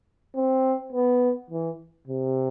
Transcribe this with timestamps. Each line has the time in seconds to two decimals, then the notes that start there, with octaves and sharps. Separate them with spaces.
0.36 C4
0.93 B3
1.50 E3
2.08 C3